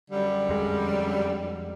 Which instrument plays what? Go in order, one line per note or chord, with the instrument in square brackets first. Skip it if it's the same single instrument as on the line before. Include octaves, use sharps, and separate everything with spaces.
[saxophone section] F#2 D3 G3
[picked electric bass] F2 G#3